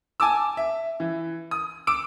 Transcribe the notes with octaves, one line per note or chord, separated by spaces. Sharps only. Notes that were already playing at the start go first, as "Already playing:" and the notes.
G#5 A5 D6 E6
E5
E3
D#6
D6 E6 D7